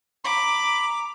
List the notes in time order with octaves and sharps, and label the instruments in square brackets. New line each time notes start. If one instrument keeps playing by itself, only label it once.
[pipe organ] A#5 [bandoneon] B5 [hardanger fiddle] D6